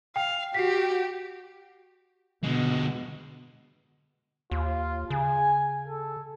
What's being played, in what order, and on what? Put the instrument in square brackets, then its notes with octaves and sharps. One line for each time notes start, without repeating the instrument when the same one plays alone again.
[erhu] F5 [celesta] G5
[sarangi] F#4 [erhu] G4 [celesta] B6 C7
[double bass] B2 [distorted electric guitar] D3 G#3
[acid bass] D#2 [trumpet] F4
[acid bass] C#3 [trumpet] G#5
[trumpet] A4